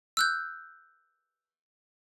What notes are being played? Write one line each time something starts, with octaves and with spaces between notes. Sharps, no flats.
E6 F#6 G6